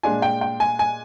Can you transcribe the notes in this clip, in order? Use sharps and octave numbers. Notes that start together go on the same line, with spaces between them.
A#2 G#3 D4 F4 G#5
G5
G5
G#5
G#5